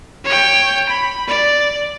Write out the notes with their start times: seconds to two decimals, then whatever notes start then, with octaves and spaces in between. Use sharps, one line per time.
0.25 C#5 G5
0.89 B5
1.27 D5